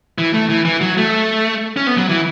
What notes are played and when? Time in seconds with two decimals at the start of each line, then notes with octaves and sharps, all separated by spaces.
0.18 E3
0.34 A3
0.49 E3
0.65 E3
0.81 F#3
0.97 A3
1.77 C#4
1.87 B3
1.98 F#3
2.09 E3